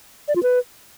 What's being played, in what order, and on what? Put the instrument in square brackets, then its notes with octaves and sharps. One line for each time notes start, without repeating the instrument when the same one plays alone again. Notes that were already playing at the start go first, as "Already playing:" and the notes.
[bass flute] D5
F4
B4